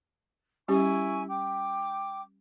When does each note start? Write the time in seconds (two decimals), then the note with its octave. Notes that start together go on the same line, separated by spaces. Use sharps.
0.68 G3 C#4 E4 G4 G#5 C#6
1.28 G5 D6